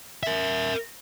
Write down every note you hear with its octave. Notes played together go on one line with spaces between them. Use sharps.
A#4 E5